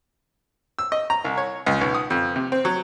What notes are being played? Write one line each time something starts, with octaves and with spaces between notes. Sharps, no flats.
E6
D#5
A#5
C2
C#5
C#2
B1
D#6
F2
C3
C4
F#3